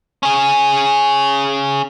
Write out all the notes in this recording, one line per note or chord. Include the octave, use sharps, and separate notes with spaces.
C#4 G#4